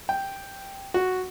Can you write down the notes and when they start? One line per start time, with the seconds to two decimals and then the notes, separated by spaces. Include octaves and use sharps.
0.09 G5
0.94 F#4